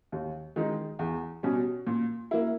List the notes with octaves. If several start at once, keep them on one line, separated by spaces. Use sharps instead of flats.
D#2
D#3 G#3 D#4
E2
B2 G3 C#4
A#2
A#3 E4